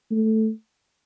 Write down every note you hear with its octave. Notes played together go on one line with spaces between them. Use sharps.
A3